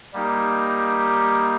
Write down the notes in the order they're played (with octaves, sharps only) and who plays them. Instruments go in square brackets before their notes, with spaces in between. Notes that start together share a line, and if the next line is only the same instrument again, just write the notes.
[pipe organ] G3 A#3 D#4 G4